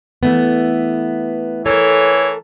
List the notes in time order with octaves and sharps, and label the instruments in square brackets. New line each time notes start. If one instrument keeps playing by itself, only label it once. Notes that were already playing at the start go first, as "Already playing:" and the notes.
[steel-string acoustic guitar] E3 A3 B3
[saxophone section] E3 C#5 [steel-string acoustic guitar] A4 A#4